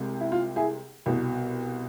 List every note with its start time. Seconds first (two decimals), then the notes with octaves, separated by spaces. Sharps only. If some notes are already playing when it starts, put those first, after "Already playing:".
Already playing: C2 C3 G#3
0.20 E4
0.32 F4
0.56 E4 G#4
1.06 C2 B2 B3